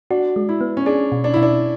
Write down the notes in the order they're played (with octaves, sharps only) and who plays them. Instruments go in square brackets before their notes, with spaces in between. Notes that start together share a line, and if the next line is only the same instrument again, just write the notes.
[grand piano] D4 [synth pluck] F#4
[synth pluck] G#3
[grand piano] E4
[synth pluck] B3
[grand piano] C#4
[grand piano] D4 [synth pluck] G#4
[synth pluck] B2
[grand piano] D4
[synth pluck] B2 [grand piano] E4
[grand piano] D4